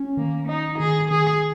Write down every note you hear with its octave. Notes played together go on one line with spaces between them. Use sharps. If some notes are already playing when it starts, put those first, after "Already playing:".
Already playing: C#4
D#3 A#3
D#4 D#5
D#3 G#4
D#3 G#4